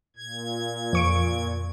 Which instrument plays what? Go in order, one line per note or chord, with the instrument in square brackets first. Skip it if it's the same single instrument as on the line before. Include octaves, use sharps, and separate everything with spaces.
[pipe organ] A#2 G#6
[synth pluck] F2 C#6 D7